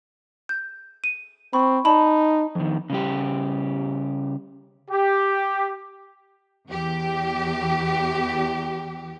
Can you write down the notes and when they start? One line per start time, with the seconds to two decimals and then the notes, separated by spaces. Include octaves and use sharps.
0.49 G6
1.04 D#7
1.53 C4 B5 C#6
1.85 D#4 D5 A5 B5
2.55 F2 D#3
2.90 C#3 G3 G4
4.91 G4
6.68 E2 G4